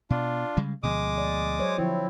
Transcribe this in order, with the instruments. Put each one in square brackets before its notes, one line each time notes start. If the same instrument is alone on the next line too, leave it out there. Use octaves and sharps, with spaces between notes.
[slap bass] B2 [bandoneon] D4 F4
[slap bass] C#3 G3 G#3
[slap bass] D2 B2 F3 [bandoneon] G#3 D6 D#6
[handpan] D5
F#3 C5 C#5
[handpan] D3 F3 E4 [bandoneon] C4